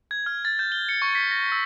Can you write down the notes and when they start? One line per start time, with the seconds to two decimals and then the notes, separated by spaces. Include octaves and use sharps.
0.11 G#6
0.26 F6
0.45 A6
0.59 G6
0.72 G7
0.89 C#7
1.02 C#6
1.15 B6
1.31 A#6
1.52 E6